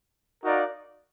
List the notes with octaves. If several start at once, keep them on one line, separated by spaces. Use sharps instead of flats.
D#4 F#4 A#4 D5 F5